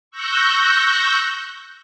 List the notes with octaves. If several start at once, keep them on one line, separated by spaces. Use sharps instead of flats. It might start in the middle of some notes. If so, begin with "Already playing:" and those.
C#6 E6 F#6 G6 A#6